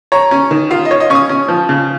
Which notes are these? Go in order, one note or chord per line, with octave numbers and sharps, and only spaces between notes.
C#5 A#5
C#4
D#3
F4 F5
D#5
C#5
D#5
C#4 C#6
D#6
C#4
F3
C#3